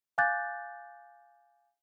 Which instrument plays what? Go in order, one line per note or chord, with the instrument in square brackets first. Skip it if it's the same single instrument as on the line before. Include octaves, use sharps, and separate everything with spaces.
[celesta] F5 G#5 D6 F#6 G6 A6